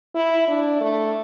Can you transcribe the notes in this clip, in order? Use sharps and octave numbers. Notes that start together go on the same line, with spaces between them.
E4
D4
A3